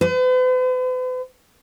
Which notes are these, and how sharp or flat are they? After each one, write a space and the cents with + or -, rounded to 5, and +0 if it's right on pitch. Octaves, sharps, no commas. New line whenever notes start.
B4 +45